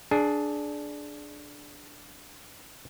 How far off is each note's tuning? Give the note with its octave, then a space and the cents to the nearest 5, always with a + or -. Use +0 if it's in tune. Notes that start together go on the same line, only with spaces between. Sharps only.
D4 +0 G#4 +20